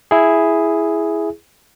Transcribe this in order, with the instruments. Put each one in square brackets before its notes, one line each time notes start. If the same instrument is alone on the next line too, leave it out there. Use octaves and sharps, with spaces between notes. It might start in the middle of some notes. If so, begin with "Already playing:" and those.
[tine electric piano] E4 G#4